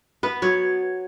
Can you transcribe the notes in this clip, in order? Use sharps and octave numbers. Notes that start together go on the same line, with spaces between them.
B3 B4
F#3 C#5